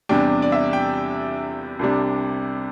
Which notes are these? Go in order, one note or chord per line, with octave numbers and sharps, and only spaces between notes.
E2 C3 G3 D4 G5
D5
E5
G5
C2 C3 G3 D4